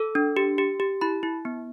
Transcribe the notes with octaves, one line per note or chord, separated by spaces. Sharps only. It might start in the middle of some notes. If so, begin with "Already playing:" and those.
Already playing: A4 E6
D4
G4
G4
G4
E4 B5
E4
B3